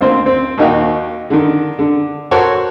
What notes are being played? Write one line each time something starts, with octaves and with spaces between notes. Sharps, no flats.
D2 A#3 C4 F4 C5
C4
D#2 A#3 D#4 F#4 G5
D3 D#3
D3
F#4 A4 A#4 C5 C#5